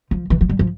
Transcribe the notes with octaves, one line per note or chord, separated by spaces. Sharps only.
F3
E3
F3
G3
F3